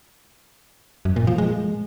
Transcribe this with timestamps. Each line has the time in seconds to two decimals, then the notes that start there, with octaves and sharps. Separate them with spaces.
1.05 F#2
1.16 A#2
1.27 F3
1.38 G#3